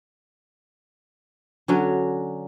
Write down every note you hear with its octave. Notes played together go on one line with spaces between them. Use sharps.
D3 F#3 C#4